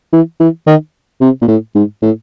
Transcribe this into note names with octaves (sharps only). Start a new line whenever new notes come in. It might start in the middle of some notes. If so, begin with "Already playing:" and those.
E3
E3
D#3
C3
A#2
A2
G#2
A2